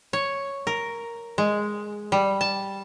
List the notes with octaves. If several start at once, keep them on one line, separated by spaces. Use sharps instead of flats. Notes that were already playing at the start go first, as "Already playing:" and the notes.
C#5
A#4
G#3
G3
A5